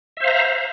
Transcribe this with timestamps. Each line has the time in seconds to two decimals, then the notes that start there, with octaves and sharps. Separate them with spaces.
0.17 E5
0.20 C5
0.24 F5
0.28 A#5